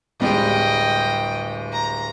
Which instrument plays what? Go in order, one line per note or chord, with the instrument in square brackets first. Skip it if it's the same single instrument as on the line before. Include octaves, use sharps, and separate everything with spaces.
[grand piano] D1 G3 G#3 [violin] D#5 G5
[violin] A#5